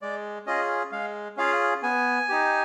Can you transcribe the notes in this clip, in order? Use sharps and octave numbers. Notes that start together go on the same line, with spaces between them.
G#3 D5
C#4 F4 G#4 D#5
G#3 F5
C#4 F4 G#4 F5
B3 G#5
D#4 G4